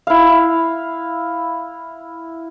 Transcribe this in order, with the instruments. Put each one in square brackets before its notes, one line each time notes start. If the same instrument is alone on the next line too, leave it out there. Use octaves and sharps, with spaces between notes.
[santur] E4 F5